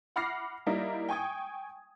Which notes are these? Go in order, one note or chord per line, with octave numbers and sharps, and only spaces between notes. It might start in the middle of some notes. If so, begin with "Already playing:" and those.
F#5 B5 D6 F6 A#6 C7
G3 A#3 D#4 E4
G5 G#5 C#6 D#6 G#6